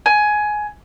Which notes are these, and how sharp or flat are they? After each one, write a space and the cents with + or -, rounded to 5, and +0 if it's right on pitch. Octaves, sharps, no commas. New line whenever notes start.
G#5 +15